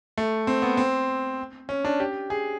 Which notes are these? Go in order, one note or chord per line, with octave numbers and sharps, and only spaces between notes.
A3
C4
B3
C4
C#4
D4
G4
G#4